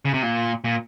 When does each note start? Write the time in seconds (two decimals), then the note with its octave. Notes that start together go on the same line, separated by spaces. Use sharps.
0.05 C#3
0.14 C3
0.22 A#2
0.64 A#2